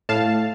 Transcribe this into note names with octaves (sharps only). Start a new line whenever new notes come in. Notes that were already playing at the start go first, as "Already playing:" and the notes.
A2 F5 A5